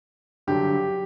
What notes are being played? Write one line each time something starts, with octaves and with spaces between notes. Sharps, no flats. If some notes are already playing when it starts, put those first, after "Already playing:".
G2 D3 F#3 G4